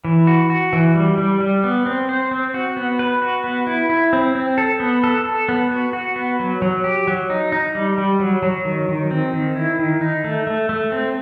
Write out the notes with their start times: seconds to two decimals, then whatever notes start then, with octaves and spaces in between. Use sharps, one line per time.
0.05 E3
0.27 F#4
0.50 F#4
0.73 E3
0.95 G3
1.18 G3
1.40 G3
1.64 B3
1.86 C4
2.09 C5
2.31 C4
2.54 F#4
2.77 B3
2.99 B4
3.22 F#4
3.44 B3
3.67 E4
3.90 E4
4.13 C4
4.35 C4
4.58 A4
4.80 B3
5.04 A4
5.25 A4
5.49 B3
5.71 F#4
5.93 F#4
6.16 B3
6.39 F#3
6.62 F#3
6.84 G4
7.07 F#3
7.30 D#4
7.52 D#4
7.75 G3
7.98 G3
8.20 F#3
8.43 F#3
8.65 D#3
8.89 D#3
9.11 C4
9.34 D#3
9.56 E4
9.79 D#3
10.01 D#4
10.24 A3
10.47 A3
10.69 A3
10.92 C4